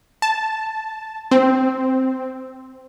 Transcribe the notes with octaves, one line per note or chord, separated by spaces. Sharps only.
A5
C4